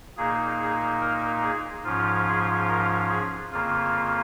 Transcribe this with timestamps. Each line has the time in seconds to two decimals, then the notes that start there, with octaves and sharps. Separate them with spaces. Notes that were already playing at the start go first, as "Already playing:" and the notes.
0.17 A#2 A#3 D#4 G#4
0.59 G#4
1.01 A#4
1.42 G#4
1.85 G#2 F3 C#4 F4
2.26 G#4
2.68 A#4
3.10 G#4
3.52 F2 C#3 A#3 F4